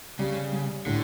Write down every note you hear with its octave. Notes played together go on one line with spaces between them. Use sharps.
C#3 G3
G3
A2 D3